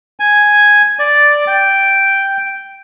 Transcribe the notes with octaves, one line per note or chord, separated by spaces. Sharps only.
G#5
D5
G5